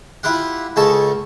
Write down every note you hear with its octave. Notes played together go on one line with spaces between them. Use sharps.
E4 F4 G4 F#5
C#2 C#3 D#4 A4 A5 C#6